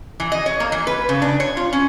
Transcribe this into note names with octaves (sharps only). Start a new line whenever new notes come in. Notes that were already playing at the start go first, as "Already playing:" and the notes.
E3
D#5
C#5
A#3
E3
B4
C#3
D4
C#5
F4
C#4